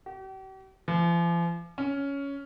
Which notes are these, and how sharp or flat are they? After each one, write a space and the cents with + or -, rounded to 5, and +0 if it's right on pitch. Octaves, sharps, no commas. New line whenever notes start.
G4 -45
F3 -40
C#4 +10